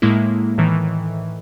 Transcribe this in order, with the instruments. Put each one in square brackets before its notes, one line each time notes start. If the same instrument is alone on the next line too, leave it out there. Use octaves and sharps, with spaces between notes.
[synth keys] A2 G#3 A#3 E4
A2 D#3 E3